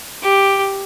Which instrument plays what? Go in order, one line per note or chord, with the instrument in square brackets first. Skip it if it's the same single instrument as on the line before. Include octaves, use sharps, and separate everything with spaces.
[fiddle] G4